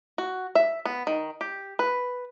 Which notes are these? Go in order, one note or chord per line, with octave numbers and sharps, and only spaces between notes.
F#4
E5
B3
D#3
G4
B4